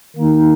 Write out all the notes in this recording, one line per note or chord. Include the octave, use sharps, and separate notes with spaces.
D#3 A#3 D#4